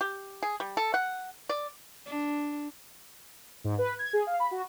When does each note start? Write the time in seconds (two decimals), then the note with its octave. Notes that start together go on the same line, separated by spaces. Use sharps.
0.01 G4
0.43 G#4
0.60 G3
0.77 A4
0.94 F#5
1.49 D5
2.06 D4
3.64 G#2
3.78 B4
3.99 G#6
4.13 G#4
4.27 F5
4.40 B5
4.51 F#4